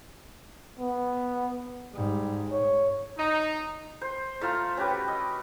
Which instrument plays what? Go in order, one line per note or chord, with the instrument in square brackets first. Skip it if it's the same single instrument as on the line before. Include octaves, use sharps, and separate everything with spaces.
[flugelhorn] B3
[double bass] G#2 [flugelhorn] G3
[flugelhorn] C#5
[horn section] D#4
[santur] C5
A3 F4 F5 A#5
C#4 F#4 G4 B4
D#5